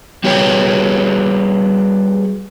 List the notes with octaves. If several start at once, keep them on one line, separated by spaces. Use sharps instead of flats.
G3 F#4 G#4 B4 C#5 G5